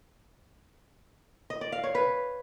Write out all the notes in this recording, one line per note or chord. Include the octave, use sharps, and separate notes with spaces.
D#5
D5
F5
C#5
B4